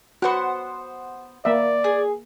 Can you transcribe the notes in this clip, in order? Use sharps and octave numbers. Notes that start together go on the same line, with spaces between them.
B3 F#4 B4 C5 F#5
A#3 D5 E5
G#4